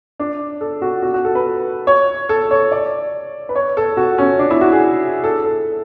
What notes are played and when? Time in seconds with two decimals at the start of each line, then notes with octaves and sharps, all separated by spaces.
0.20 D4
0.61 A4
0.82 F#4
1.02 F#4
1.14 F#4
1.25 A4
1.35 B4
1.87 C#5
2.29 A4
2.51 C#5
2.72 D5
3.49 B4
3.55 C#5
3.77 A4
3.97 F#4
4.18 C#4
4.39 D4
4.51 E4
4.61 F#4
4.72 G#4
5.24 A4
5.44 A4